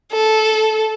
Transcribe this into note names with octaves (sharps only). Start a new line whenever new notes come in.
A4